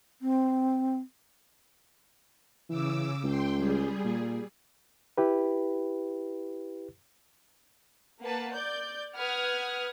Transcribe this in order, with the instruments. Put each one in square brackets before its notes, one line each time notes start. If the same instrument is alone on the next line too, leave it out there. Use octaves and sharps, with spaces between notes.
[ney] C4
[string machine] C#3 D6 E6 [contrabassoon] E3
[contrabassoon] C#2 [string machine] G5 C6
[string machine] G3 G#4
[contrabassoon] A#2
[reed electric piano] E4 G4 B4
[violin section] A#3 B4 F#5 A5
D5 G6
B4 F#5 D#6 F6 G#6